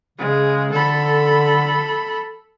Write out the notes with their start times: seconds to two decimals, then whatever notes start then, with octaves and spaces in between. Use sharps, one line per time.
0.18 C#3 G#3
0.72 D3 A4 B5